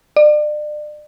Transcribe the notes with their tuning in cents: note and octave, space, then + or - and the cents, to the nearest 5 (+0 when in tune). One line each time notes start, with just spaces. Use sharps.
D5 +35